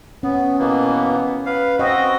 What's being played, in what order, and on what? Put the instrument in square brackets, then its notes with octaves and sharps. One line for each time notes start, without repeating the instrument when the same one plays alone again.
[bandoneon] B3 [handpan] C#4
[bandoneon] B2 E3 A#3 [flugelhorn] B3
[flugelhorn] B4 [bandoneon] F5
[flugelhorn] C4 [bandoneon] F#4 [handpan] D#5